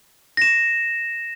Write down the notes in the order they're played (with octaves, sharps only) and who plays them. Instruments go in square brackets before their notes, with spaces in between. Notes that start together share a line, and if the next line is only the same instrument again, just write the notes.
[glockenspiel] A#6 E7